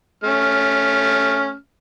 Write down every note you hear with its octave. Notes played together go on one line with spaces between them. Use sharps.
A3 C#4 F6